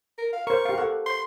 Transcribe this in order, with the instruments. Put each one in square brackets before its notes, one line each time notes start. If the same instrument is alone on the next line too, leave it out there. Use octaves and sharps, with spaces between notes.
[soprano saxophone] A#4
F5
[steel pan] A#4 C5 [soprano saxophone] C#6
[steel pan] G4 F5
A4 F#5
[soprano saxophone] C6